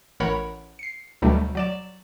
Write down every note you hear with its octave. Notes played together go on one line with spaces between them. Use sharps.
A1 A#4 C#5 F#5 B5
C7 C#7
D2 B2 F#3 G3 A3
F#3 D5 E7